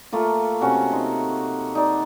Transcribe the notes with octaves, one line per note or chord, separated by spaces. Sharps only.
A3 A#3 F4
C3 C#4 F#4
D#4 C5
D#4 D5